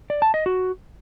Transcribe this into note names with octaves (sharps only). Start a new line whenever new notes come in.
D5
A5
D#5
F#4